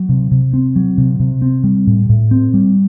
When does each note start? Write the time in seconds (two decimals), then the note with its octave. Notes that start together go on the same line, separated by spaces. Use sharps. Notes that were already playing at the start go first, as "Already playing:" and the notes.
Already playing: F#3
0.09 C3
0.31 C3
0.53 C4
0.76 F#3
0.98 C3
1.20 C3
1.42 C4
1.64 G3
1.87 A2
2.09 A2
2.31 C4
2.54 G3